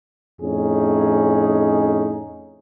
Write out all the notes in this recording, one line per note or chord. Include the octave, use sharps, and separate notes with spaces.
F2 A2 C#4 D#4 G#4